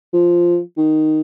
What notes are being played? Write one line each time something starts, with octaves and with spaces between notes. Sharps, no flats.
F3
D#3